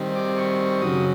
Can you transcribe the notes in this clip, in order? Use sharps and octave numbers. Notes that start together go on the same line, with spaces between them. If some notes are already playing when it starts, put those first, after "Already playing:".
Already playing: D#3 G3 C4
D6
C#6
F#2 C#3 F#3 D#6